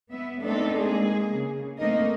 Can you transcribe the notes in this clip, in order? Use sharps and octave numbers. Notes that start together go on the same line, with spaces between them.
B3 E5
A3 B3 C4 D4 D#4 A4
G#3 A#3 G#4
C#3
A3 A#3 C4 D#4 A#4 D#5